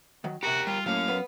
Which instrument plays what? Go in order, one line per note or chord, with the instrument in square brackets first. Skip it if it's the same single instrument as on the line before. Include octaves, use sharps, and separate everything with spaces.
[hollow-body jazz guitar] D#3 F#3
[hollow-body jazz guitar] C3 A#5 [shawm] F#4 [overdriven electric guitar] G4 A#4
[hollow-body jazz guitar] G3 [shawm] F4
[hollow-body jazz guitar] A2 A#3 [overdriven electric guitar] F#3 C#4 [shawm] F5
[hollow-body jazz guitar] B3 B4